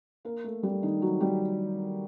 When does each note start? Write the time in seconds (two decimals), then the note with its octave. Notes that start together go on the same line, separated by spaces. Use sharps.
0.25 A#3 A#4
0.44 A3 A4
0.63 G3 G4
0.83 D#3 D#4
1.02 F#3 F#4
1.20 G3 G4